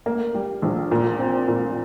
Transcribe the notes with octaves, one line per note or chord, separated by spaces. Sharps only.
A#3
G3
A#1
A#2
C4
A#2